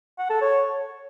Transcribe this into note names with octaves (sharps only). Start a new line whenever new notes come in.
F#5
A4
C#5